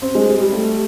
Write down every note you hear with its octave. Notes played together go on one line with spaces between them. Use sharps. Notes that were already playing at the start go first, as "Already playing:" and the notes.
C4
G#3
G3
G3
A3